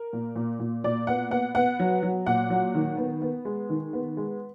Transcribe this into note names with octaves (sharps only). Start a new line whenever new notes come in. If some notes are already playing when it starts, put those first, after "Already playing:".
Already playing: A#4
A#2
A#2
A#2
A#2 D5
B3 F#5
B3 F#5
B3 F#5
F#3
F#3
A#2 F#5
F#3
D#3
B3
B3
G#3
D#3
B3
G#3